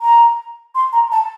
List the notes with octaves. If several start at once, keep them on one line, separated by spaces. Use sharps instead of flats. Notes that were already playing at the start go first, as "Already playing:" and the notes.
A#5
C6
A#5
A5